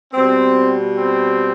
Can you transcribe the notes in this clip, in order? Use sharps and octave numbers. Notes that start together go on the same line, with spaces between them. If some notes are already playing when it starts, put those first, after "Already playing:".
B2 G3 C4
C4